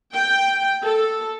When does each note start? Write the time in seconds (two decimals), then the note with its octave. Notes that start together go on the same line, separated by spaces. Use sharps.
0.14 G5
0.82 A4